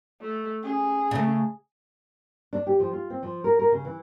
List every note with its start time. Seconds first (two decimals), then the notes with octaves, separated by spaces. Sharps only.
0.21 A3
0.64 C#4 G#4
1.11 C#3 A3
2.53 D4
2.67 G4
2.80 F3
2.93 F4
3.10 C4
3.23 F3
3.44 A#4
3.59 A#4
3.72 C#3
3.85 E3